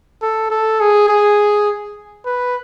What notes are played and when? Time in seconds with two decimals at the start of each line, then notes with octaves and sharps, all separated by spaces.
0.22 A4
0.50 A4
0.80 G#4
1.09 G#4
2.26 B4